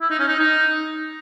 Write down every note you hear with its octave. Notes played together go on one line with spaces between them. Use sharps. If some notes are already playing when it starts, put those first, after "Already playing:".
E4
D#4
C#4
D#4
D#4